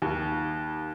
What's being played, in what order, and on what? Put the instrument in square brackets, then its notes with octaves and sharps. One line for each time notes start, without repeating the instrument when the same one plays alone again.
[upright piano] D#2